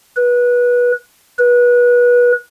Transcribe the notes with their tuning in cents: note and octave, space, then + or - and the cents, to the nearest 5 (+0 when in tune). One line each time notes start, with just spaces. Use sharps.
B4 -20
B4 -25